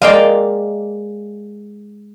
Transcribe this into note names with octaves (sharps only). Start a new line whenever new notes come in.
G#3 A#3 D5 D#5 F5 G5